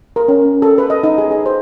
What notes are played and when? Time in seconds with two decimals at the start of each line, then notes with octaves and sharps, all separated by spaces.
0.16 A#4
0.28 C#4
0.41 C#4
0.62 A4
0.78 B4
0.90 D#5
1.03 D#4
1.18 G#4
1.31 G#4
1.46 C5